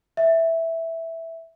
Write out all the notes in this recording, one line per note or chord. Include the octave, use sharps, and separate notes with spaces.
E5